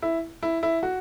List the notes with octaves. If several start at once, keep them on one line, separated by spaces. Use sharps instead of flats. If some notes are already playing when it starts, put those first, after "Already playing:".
E4
E4
E4
F#4